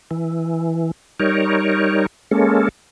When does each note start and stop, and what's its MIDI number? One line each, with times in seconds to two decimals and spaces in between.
0.11 0.91 52
1.20 2.06 55
1.20 2.06 63
1.20 2.06 70
1.20 2.06 73
2.31 2.69 56
2.31 2.69 58
2.31 2.69 61
2.31 2.69 69